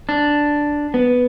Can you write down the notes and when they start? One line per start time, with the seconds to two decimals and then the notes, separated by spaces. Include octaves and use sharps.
0.09 D4
0.94 B3